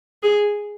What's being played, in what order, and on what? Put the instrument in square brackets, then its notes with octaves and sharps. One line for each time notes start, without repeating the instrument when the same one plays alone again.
[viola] G#4